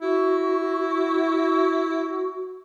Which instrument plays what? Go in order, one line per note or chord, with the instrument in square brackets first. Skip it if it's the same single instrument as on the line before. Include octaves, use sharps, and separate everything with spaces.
[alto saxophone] E4 [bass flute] F#4